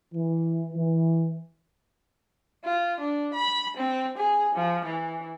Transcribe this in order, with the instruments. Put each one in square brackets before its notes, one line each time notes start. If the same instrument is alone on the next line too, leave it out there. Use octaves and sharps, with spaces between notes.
[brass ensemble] E3
E3
[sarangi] F4
D4
B5
C4
G#4
F3
E3